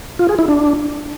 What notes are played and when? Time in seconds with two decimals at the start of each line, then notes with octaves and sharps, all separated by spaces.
0.19 F4
0.29 G#4
0.39 E4
0.48 D4